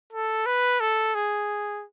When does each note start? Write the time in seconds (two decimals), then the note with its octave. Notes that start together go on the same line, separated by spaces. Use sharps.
0.13 A4
0.46 B4
0.80 A4
1.15 G#4